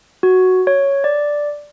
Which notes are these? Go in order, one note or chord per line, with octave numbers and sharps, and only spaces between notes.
F#4
C#5
D5